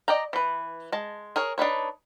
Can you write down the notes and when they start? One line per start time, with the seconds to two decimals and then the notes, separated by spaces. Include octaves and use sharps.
0.08 D5 D#5 G5 A#5
0.33 E3 B4
0.92 G#3 A5
1.36 G#4 A#4 C#5
1.58 D4 D#4 B4 C#5